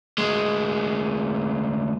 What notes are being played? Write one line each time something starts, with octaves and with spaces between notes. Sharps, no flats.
D2 G#3